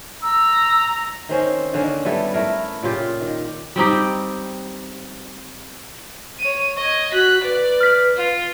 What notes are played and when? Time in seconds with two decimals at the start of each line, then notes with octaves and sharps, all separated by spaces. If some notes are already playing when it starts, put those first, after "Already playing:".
0.22 A#5 E6
1.29 D#3 C4 C#4 C5
1.74 D3 D#3 A#3 C#4
2.05 G3 B3 E4 A4
2.34 A3 E4 A#4
2.83 A#2 C#3 F4 G4
3.21 D#3
3.76 G3 C4 D#4 G4
6.39 C#5 D#7
6.77 D#5 C#6 G#6
7.13 F#4 F#6 B6
7.44 B4 D5
7.81 F6 B6
8.17 F4